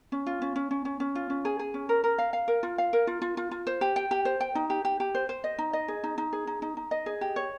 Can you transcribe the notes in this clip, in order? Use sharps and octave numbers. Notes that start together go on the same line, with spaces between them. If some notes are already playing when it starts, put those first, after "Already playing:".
C#4
F4
C#4
C#4
C#4
C#4
C#4
F4
C#4
G#4
G#4
C#4
A#4
A#4
F5
F5
A#4
F4
F5
A#4
F4
F4
F4
F4
C5
G4
G5
G4
C5
G5
D#4
G4
G4
G4
C5
C5
D#5
D#4
D#5
G#4
D#4
D#4
G#4
D#4
D#4
D#4
D#5
G#4
G4
C#5